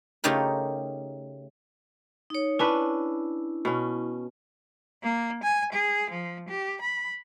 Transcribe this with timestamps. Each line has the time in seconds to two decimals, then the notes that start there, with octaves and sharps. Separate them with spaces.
0.24 C#3 A3 D#4 F4 G4 A#4
2.30 D#4 C#5
2.59 C#4 D4 E4 B4
3.65 B2 C#4
5.03 A#3
5.43 G#5
5.72 G#4
6.10 F3
6.49 G4
6.82 B5